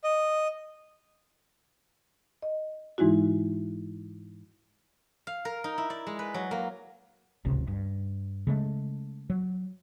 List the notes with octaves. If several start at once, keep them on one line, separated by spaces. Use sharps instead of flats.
D#5
D#5
G#2 E3 G#3 D#4 E4 F#4
F5
A#4
D#4
E4
D5
G#3
B4
F#3
A#3
D1 G#1 C#2 C3
G2
C#3 G#3 A3
F#3